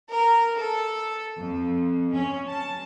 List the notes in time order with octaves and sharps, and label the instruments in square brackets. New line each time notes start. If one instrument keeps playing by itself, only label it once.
[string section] A#4
A4
F2
C#4
A5